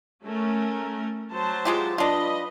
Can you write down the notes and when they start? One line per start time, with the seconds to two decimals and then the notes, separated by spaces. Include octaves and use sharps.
0.24 A3 C#4 A#4
1.31 F#3 C5 A5
1.65 G#3 F4 G4
1.98 D4 F4 B4 D#5